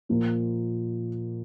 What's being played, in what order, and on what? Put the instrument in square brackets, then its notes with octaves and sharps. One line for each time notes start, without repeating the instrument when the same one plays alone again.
[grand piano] A#2 F3 A#3